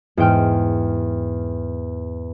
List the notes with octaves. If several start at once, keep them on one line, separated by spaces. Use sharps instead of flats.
E2 G#2 G5 F6